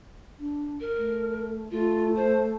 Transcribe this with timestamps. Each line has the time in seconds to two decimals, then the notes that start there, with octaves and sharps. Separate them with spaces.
0.40 D4
0.80 A#4
0.97 A3
1.71 A3 F4
2.16 C5